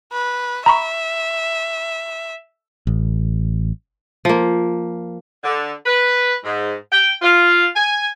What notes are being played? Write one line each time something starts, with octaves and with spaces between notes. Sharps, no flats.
B4
E5 A#5 B5 C#6
A1
F3 A#3
D3
B4
G#2
G5
F4
G#5